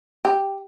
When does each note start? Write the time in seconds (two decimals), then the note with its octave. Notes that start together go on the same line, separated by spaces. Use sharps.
0.25 G4